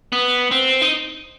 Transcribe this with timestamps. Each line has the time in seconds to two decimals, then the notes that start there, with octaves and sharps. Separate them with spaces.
0.12 B3
0.51 C4
0.81 D#4